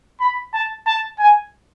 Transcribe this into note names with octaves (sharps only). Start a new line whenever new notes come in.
B5
A5
A5
G#5